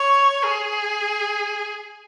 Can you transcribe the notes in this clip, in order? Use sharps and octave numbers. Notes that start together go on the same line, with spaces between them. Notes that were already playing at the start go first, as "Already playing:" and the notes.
Already playing: C#5
G#4